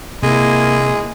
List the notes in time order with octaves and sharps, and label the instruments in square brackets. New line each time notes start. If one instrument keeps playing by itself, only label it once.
[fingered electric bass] C3 [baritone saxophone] G#3 [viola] A#3 E4